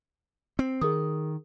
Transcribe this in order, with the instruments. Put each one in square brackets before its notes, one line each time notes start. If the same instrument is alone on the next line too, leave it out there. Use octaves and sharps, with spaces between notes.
[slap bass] C4
[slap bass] D#3 [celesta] G#4 A#4 D#6